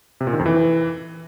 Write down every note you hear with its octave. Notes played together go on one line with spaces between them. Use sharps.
C3
A#2
D#3
F2
E3